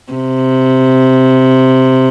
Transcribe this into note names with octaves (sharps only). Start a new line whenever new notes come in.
C3